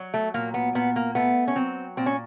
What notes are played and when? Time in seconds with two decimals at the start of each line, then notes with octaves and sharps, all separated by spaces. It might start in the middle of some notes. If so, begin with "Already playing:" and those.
Already playing: F#3
0.14 A3
0.34 A#2 A#3
0.54 B3
0.75 A#2 B3
0.96 A#3
1.15 A3 B3
1.48 C#4
1.56 F#3 C4
1.97 A#2 C4
2.06 C#4